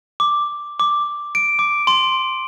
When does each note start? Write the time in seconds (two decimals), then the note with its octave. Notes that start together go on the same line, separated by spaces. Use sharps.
0.20 D6
0.80 D6
1.35 D7
1.59 D6
1.87 C6